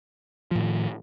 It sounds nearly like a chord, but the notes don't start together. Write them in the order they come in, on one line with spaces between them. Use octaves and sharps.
F3 A2 D#3